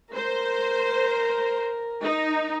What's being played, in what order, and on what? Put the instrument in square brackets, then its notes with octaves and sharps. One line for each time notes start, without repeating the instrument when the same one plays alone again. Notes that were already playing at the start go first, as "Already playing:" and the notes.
[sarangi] A#4 [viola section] C5
[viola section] D#4